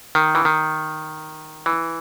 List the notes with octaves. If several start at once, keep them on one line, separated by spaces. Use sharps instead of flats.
D#3
E3
D#3
E3